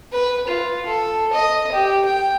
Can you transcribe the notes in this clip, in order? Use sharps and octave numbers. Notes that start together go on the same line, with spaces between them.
B4
F4
A4
D#5
G4
G5